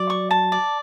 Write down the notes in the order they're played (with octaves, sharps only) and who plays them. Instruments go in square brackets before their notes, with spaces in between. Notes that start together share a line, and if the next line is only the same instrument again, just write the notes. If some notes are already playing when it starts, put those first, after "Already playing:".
Already playing: [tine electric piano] F#3 F#4 [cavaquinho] D5
[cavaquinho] C#6
A5
D5